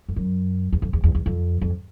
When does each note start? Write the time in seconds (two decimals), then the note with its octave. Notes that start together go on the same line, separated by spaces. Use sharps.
0.09 F2
0.16 F#2
0.72 E2
0.82 F2
0.93 E2
1.04 E2
1.15 E2
1.26 F2
1.61 F2